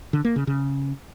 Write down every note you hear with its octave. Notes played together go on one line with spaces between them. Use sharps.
D3
A#3
C#3
C#3